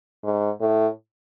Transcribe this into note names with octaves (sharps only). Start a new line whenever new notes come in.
G#2
A2